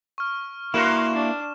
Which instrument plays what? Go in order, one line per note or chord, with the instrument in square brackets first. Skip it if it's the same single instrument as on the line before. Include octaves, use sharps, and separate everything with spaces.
[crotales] C#6 F6
[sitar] G2 F#4 A#4 [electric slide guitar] A#3 E4 [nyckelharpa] F5 C6 [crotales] E7
[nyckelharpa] D4